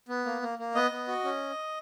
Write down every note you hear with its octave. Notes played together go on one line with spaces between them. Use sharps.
B3
A#3
A#3
A#3
B3 D#5
B3
F#4
C#4